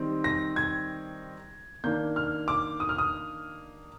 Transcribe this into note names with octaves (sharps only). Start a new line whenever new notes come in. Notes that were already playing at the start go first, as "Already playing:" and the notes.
Already playing: D#3 G3 C4 D#4
A#6
G#6
D#3 A#3 D4 G6
F6
D6
D#6
F6
D#6